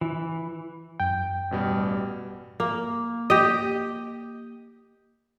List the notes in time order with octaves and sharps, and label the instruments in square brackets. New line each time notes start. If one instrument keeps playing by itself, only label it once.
[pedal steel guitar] E3
[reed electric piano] F#2 G5
[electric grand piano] A1 B2 G3
[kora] A#3
G4 D#5